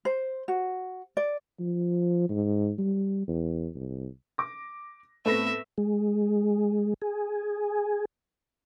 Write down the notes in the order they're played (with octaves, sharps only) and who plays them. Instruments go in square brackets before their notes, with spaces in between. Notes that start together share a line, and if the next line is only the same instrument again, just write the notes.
[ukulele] C5
F#4
D5
[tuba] F3
G#2
G3
E2
C2
[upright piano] D6 A#6
[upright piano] A2 B3 C4 [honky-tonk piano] A3 B4 A#6 [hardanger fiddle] E5
[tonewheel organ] G#3
G#4